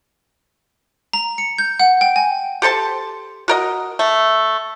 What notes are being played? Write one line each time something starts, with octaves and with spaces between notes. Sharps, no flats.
A#5
C#7
G6
F#5
G5
G#5
G4 A4 C5 A5
F#4 A#4 D#5
A3